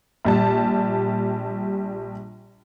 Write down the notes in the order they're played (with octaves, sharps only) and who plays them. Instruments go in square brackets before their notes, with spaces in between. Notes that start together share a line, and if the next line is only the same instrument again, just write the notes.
[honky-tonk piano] A#1 G3 A5